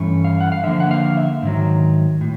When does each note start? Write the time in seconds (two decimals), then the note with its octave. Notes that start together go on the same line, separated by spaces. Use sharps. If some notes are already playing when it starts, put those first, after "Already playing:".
Already playing: G2 E3 A3 C#4
0.24 F5
0.40 F#5
0.52 F5
0.64 D3 F3 A#3 E5
0.80 F#5
0.91 F5
1.17 E5
1.42 G#2 D#3 F#3
2.21 A2